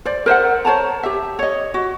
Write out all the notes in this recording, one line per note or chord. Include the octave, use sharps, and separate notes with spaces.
C5 D5
A#4 C5 E5 F#5
C5 C#5 A5 A#5
G4 E5
C#5 D#5
F#4